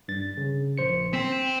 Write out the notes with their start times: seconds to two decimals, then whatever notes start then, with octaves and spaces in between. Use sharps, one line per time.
0.08 G2 A6
0.37 C#3
0.78 A#1 C5 C#7
1.13 C4 C5 B6